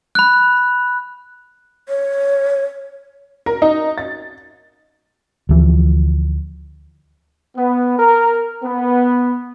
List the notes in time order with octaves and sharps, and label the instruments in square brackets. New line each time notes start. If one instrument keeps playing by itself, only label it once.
[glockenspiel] B5 F#6
[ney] C#5
[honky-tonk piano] A#4
D#4
A6
[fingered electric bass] D2 E3 F3
[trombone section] B3
A#4
B3